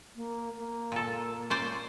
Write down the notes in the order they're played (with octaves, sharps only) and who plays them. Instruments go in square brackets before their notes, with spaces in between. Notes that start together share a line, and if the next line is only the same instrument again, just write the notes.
[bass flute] A#3
A#3
[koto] A#2 A4
C#4 C5 D5